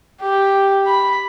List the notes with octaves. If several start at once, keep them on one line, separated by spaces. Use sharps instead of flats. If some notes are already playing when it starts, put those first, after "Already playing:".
G4
B5